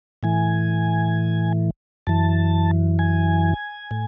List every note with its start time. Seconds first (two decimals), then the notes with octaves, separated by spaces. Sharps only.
0.23 A2 E3 G#5
2.07 F#2 E3 A5
2.99 G#5
3.91 A2